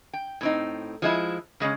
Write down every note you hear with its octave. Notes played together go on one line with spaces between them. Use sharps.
G5
A2 C4 D#4
F3 G#3 E4
C#3 G#3 C4 C#4